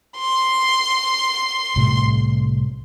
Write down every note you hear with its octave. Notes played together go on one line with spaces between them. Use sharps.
C6
C2 A2 A3